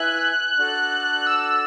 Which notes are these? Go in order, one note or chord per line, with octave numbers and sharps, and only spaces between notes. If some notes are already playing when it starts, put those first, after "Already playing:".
Already playing: E4 B4 E5 G#5 F#6
D4 F#4 A4 D5
E6